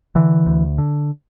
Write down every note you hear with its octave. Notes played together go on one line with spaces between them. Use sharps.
D3 E3
D2
D3